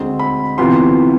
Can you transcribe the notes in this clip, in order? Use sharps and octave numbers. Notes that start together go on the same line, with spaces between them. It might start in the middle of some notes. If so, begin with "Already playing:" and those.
Already playing: D2 D3 G#3 C4
B5
D2 C3 E3 B3 F4 C6